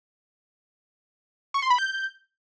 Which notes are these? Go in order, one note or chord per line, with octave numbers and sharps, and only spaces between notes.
C#6
C6
B5
G6